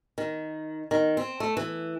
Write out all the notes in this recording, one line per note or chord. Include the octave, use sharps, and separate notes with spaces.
D#3
D#3
C4
A3
E3